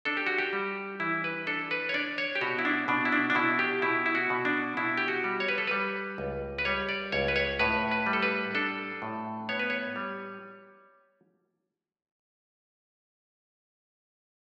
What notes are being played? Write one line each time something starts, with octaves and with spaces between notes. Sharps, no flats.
D4 A4
G4
F#4
G4
G3
E3 E4
B4
D4 A4
B4
C#5
D4 D5
C#5
G4
B2 F#4
E4
D4
B2 D4
E4
D4
D4
B2 E4
G4
B2 E4
E4
F#4
B2
D4
B2 E4
G4
F#4
G3
C#5
B4
A4
G3 B4
C#2
B4
G3 C#5
D5
C#2 C#5
B4
C#5
A2 B4
B4
G3
A4
B4
D4 A4
A2
B3 C#5
B4
C#5
G3